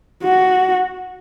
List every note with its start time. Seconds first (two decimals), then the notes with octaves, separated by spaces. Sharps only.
0.23 F#4